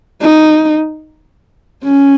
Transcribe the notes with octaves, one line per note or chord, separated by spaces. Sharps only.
D#4
C#4